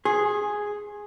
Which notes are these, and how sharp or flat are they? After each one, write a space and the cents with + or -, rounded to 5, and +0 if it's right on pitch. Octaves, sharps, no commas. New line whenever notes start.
G#4 +0 C6 +35